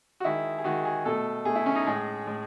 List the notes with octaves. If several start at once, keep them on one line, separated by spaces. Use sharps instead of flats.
F#4
D#3 G#3 E4
G#4
D#3 G#3 F#4
G#4
B2 A3 A4
B2 A3 G#4
E4
C#4
D#4
A2 G#3 G#4
A2 G#3